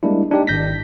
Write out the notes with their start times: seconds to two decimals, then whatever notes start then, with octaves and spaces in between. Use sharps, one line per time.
0.03 G3 G#3 A#3 D4 E4
0.31 D4 D#4 G4 D5
0.47 G#1 G6 A#6 B6